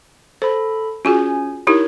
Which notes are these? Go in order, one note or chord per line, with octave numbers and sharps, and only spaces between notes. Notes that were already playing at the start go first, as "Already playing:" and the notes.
A4 C5 B5
C#4 F4 F#4 G#4 G#5
D#4 E4 G4 A#4 C#5